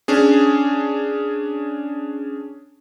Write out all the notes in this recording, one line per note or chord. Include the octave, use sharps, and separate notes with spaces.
C#4 D4 G#4